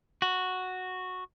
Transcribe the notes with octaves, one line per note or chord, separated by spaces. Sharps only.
F#4